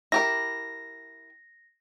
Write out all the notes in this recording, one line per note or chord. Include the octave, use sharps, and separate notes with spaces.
E4 G4 A#4 A#6